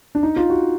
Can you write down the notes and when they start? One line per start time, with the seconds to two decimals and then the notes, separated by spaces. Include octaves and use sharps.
0.15 D4
0.23 D#4
0.36 F4
0.50 F#4